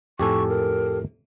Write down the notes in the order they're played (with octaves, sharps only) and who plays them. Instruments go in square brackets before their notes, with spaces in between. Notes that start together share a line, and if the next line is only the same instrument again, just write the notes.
[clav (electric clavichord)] F2 A2 G#5 [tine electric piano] G4 A4 [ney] C#6
[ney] A#4